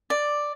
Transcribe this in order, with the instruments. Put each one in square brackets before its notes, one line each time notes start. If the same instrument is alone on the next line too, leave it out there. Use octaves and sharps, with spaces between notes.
[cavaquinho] D5